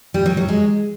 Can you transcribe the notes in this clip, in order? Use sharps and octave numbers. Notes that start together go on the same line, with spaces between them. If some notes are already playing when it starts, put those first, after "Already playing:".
G3
F#3
F#3
G#3